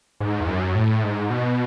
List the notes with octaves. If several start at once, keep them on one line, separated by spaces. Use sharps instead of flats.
G#2
E2
F#2
A2
G#2
B2